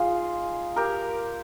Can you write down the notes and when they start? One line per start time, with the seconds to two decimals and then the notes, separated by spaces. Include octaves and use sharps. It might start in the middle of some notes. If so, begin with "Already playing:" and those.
Already playing: G#3 D#4 F4 G#4
0.76 G4 A#4